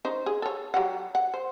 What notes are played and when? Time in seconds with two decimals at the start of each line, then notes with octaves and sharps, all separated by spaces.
0.05 C#4 D#4 C5
0.26 G#4
0.42 A4 C#5
0.74 F#3 G4 F#5
1.15 F#5
1.34 C5